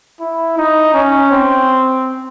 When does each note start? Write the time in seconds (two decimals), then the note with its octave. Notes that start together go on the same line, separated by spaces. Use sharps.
0.20 E4
0.58 D#4
0.94 C#4
1.31 C4